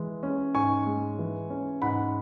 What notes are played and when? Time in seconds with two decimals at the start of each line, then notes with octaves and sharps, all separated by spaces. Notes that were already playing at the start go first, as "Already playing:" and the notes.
Already playing: E3 G#3
0.23 C#4
0.55 G#2 G#5 C#6
0.86 G#3
1.19 E3
1.50 C#4
1.82 G#2 F#5 B5